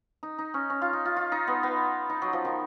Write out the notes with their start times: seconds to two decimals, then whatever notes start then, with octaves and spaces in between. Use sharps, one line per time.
0.23 D#4
0.38 D#4
0.54 C#4
0.70 C#4
0.82 F4
0.93 D#4
1.05 F4
1.17 F4
1.32 D#4
1.48 B3
1.63 B3
2.09 D#4
2.22 F#3
2.33 F3
2.45 D#3